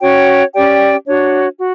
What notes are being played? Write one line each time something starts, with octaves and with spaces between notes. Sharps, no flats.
C#4 F#4 C#5 G5
C#4 G4 D5 G5
D4 F#4 C#5
F#4